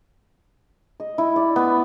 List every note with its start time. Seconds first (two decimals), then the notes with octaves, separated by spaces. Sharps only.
1.00 D#5
1.18 E4
1.36 D5
1.56 B3